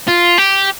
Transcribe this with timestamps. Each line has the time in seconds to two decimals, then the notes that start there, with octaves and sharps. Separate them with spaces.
0.08 F4
0.38 G4